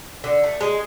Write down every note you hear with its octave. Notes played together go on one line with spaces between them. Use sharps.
D3
A3
G#3